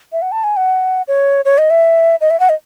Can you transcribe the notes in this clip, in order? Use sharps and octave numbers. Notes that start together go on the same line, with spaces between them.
E5
F#5
A5
G#5
F#5
C#5
C#5
D#5
E5
D#5
E5
F#5
D#5